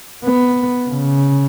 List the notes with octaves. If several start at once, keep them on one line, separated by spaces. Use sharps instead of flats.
B3
C#3